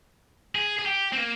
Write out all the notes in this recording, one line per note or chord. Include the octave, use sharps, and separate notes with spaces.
G#4
G#4
G4
C4
A#3